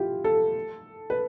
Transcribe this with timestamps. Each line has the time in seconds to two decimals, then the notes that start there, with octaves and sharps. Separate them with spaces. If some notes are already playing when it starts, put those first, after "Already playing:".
Already playing: E4 F4 G4
0.24 A4
1.10 B4